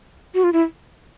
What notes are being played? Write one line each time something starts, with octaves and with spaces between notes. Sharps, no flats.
F#4
F4
E4